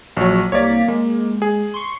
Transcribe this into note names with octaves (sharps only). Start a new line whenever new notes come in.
A#1 F#3 F#4
C2 A#3 C#5 D5 B6
G#3 A#3
G#4
C6 C#6